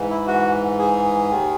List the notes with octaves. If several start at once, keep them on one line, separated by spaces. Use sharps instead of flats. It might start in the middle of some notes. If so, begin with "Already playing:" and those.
Already playing: G#2 E3
E4
F#4
G#4
D#2 D#3